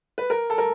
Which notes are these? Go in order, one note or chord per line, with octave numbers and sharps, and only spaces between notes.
B4
A#4
A4
A#4